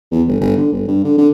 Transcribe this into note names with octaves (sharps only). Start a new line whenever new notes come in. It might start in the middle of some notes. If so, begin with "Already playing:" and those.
E2
G1
G1
D3
G1
G2
D3
D3